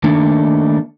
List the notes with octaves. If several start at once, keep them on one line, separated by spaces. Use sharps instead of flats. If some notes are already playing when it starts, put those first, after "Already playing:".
D#3 A3 A#3 D4